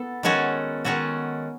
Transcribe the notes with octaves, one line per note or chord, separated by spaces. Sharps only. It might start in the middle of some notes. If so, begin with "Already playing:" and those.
Already playing: B3 A4
D#3 G#3 C#4 F#4 A4
D#3 G#3 C#4 F#4 A4